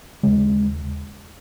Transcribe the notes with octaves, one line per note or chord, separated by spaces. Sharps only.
D#2 C#3 G#3